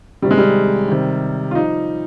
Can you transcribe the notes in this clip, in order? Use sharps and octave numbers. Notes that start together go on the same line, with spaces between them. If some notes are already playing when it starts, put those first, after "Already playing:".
C3 D#3 G3
G#3
G3
C3 D#3
F4
F3 D#4